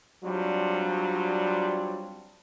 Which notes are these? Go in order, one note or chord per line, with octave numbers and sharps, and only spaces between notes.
F#3 G3 C4 D4 F4